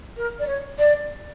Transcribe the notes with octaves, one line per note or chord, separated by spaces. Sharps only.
A#4
D5
C#5
D5